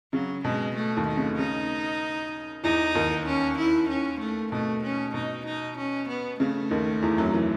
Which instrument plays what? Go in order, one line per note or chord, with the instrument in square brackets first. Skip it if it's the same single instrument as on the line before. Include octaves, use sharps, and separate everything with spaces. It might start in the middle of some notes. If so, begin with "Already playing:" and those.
[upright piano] C#3 [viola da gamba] F#3
[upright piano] B2 [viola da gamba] G#3
[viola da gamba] A3
[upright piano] D#2 D#3
[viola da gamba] A3
[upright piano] C#3
[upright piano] C#3 [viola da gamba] D#4
[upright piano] E2 E3 [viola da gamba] D#4
[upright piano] D#2 D#3
[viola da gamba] C#4
E4
C#4
A3
[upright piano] B2 [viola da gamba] A3
[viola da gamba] C#4
[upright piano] B2 [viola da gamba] D#4
[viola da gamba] D#4
C#4
B3
[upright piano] C#3 [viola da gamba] A3
[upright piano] D#2 D#3
E2 E3
F#2 F#3
E3